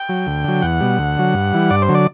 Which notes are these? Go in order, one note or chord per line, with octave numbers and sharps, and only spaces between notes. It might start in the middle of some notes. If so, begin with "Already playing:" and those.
Already playing: G5
F#3
D2
D3 F#3
E2 F#5
B2 G3
D2
D3 F#3
G2
E3 G3
G2 D5
C5
D3 F#3
D5